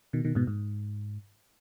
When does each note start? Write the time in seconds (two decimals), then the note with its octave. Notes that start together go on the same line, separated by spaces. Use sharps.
0.13 B2 D#3
0.25 B2 D#3
0.35 G#2 B2
0.47 G#2